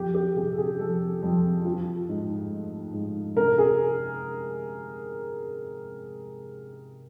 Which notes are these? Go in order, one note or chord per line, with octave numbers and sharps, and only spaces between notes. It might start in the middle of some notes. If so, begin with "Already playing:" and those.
Already playing: F2 G4
G4
C3 G#4
A4
G#4
F2 A4
F2
F3
G#2
A3
G#2
C3 A#4
G#4